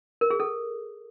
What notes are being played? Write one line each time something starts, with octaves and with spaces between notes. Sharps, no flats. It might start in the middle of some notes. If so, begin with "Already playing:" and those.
A#4
G#4
A4